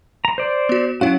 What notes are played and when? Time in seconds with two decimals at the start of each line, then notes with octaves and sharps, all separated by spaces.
0.25 A#5
0.38 C5 D5
0.69 B3 F#4
1.01 F#3 C#4 E4 F#4 F5